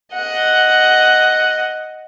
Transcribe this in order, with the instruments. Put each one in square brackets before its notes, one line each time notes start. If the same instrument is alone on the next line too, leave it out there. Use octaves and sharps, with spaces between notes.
[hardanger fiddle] D#5 F#5